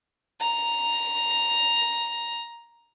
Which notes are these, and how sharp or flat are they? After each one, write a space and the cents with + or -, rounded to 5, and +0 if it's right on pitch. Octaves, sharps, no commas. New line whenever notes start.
A#5 +5